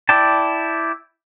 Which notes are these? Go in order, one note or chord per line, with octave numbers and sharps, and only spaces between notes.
E4 D5 G5 A5